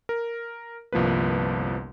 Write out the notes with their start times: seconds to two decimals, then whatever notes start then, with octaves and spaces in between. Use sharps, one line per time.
0.09 A#4
0.93 G1 C2 F3 A#3 B4